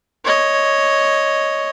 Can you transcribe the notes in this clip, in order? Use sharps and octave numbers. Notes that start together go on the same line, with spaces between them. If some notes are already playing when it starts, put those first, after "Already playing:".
C#5 D#5